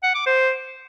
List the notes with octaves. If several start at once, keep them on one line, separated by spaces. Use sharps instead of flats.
F#5
D6
C5